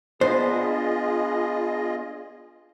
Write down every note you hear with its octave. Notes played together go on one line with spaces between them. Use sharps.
B3 D4 F4 G#4 C5 D#5